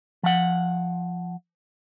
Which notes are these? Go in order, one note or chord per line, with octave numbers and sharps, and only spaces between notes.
F3 F#5